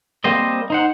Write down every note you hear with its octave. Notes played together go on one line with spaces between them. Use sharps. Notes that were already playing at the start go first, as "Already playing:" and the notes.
G3 A#3 C4 C5 D#5
D#4 C5 F#5